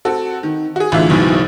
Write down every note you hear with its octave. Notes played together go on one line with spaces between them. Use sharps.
C4 F#4 A4
D#3
F#4 G#4
A1 D3 E3 F4 E5
F#1 B1 B2 D#3 E3